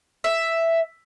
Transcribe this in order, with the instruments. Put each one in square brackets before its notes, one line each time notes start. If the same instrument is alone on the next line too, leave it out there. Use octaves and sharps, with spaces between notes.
[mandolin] E5